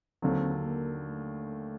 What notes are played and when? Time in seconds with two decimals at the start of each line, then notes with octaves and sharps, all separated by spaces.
0.22 D#2 D3 F#3 C4
0.65 A#3
1.06 A3